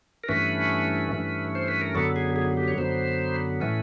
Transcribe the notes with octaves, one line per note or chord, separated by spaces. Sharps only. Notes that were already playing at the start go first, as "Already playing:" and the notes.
A#4
G2 E3 A3 C#4 B4
G2 E3 A3 C#4
C5
B4
A#4
F#2 D3 F#3 B3 A4
G#4
G#4
G4
C#5
F#2 D3 F#3 B3 C5
A2 E3 A3 C#4 B4